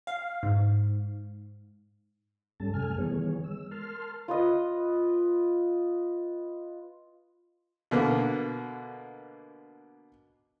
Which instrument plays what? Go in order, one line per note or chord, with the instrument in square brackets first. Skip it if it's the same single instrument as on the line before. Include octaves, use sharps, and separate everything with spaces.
[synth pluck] F5
G#2
[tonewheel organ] G2 G3 C#4 A4 A5
F#2 C3 A3 A4 G#5 F6
D#3 E3 G3 B3 G#4 C#5
G#3 E6
A#4 A5 C6 F6
[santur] F4 B4 D#5
[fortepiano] B2 D3 A#3